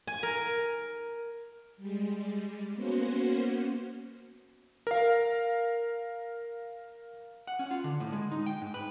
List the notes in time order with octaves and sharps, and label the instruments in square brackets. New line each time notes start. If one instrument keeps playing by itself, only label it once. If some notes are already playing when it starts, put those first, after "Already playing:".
[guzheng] G#5
A#4
[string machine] G3 G#3
A#3 B3 C#4 F#4 C5
[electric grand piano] A#4 F5
[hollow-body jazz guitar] F#5
C#4
F4
D3
A2
G#3
D#4
G5
G#2
B4